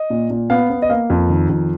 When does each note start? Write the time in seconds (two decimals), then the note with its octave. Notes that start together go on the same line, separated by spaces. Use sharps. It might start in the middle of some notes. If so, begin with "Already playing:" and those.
Already playing: D#5
0.10 A#2
0.30 A#2
0.50 B3 F5
0.70 B3
0.82 D#5
0.90 A#3 F5
1.10 F2
1.30 D#3
1.49 F2